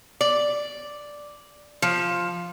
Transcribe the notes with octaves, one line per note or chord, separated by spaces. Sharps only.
D5
F3